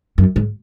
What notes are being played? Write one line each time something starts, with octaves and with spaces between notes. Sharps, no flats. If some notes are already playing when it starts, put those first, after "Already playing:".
F#2
G#2